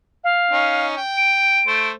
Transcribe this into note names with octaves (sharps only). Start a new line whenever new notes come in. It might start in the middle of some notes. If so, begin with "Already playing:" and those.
F5
C#4 D#4
G5
D7
A3 C5